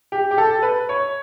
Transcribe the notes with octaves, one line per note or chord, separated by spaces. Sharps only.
G4
G4
A4
B4
C#5